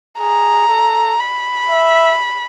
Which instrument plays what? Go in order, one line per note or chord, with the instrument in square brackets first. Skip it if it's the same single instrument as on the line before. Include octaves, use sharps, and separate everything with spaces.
[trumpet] G#4 [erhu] A#5
[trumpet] A4
[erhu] B5
[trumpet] E5